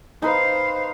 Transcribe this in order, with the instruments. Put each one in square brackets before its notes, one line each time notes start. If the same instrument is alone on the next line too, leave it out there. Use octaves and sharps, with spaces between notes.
[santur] D#4 B4 [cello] C5 F5